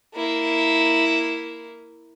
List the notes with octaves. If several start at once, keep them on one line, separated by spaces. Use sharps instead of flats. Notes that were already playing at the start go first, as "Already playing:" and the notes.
A#3 E4